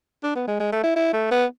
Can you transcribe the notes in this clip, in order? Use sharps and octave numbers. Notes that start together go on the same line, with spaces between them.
D4
B3
G#3
G#3
A3
E4
E4
A3
B3